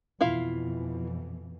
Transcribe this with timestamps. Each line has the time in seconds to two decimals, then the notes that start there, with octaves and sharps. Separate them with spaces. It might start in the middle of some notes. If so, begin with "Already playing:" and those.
0.21 F2 B2 E3 E4 F4 F5